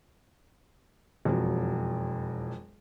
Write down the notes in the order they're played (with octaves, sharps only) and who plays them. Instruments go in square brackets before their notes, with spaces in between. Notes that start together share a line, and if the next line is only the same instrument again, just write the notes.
[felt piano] E1 F2 F#3